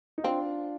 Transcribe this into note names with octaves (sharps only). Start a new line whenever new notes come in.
D#4
C4 D4 F4